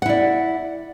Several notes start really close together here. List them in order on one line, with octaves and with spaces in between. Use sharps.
F#5 E4 D5